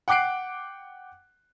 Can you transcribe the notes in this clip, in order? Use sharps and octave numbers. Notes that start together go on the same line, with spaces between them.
F#5 G5 D6 F#6 C7 D7